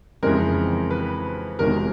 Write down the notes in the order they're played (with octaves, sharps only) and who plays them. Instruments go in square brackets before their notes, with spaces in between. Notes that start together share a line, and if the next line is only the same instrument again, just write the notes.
[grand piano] F2 C#3 E3 G#3 C4 A#4
B4
E1 E2 C3 D#3 A#4